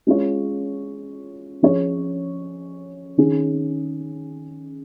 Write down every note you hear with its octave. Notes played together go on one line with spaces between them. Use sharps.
G#3 C#4 F4 C#5
F3 C#4 G#4 C#5
D#3 C#4 G#4